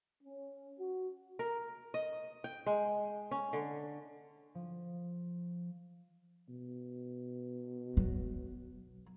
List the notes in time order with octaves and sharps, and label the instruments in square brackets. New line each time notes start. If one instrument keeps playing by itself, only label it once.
[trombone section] C#4
F#4
[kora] A#4
D#5
G5
G#3
C#4
D3
[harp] F3
[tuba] B2
[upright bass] F#3